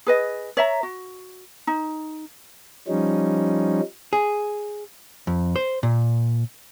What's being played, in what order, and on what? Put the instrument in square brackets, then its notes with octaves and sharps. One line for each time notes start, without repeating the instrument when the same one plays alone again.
[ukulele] G#4 B4 D#5
C#5 E5 A#5
F#4
D#4
[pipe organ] F3 G3 C#4 D#4
[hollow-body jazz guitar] G#4
F2
C5
A#2